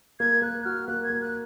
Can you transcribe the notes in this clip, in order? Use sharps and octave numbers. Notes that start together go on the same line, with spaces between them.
A#3 G#6
A#3 F#6
F#4 F6
A#3 F#6
G#6
A#3
F#6